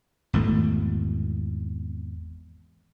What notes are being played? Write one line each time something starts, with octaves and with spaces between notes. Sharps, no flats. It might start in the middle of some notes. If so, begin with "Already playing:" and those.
G#1 E2 B2 A3